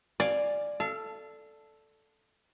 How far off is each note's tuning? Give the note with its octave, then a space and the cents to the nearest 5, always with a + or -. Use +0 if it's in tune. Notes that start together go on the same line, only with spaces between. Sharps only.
D5 +5 F5 +0 G#5 -10
A4 +0 F5 -35